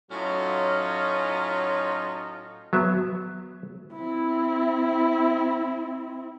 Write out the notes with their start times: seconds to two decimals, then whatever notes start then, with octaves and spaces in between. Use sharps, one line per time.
0.11 A2 F#3 C#4 D#4 F4
2.73 F#3 B3 E5
3.94 C4 E4